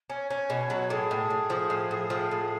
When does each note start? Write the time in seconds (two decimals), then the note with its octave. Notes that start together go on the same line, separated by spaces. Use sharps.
0.10 C#4 C#5
0.30 C#4
0.50 B2
0.70 F#3
0.90 A2 G#4
1.11 A2
1.30 A2
1.50 F3
1.70 A2
1.91 A2
2.10 F3
2.31 A2